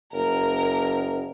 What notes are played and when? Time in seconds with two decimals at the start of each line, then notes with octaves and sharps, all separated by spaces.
0.13 F#1 A#4